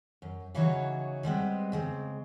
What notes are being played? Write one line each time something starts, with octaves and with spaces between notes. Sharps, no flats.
F#2
C#3 E3 F#3 D#4 F#4 C#5
G3 G#3 B3 C4
C#3 G#3 C4